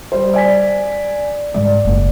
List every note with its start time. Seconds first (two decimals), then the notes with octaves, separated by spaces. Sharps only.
0.12 G3 C5
0.34 D5 G#5 B6
1.54 G#2 G#3 D5
1.85 F#1